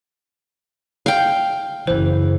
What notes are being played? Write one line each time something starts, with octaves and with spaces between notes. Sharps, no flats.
F5 G5
F#1 E3 C5